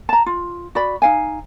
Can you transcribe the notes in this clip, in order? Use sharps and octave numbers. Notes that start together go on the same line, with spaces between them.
A5 A#5
F4
F#4 D5 B5
D#4 F5 G#5